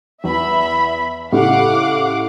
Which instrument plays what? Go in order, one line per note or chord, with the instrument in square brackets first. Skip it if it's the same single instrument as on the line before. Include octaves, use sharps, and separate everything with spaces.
[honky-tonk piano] E2 [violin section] E5 B5
[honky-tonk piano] A2 C#3 G4 [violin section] F5 F#5 D6